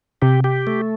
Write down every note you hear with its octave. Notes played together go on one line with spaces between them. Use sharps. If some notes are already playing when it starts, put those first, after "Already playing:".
C3 G4
G4
A3